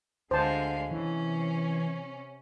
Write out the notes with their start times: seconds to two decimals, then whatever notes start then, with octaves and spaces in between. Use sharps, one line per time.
0.31 D2 D3 G#3 C5 F5 A5
0.91 C3 E3 C#4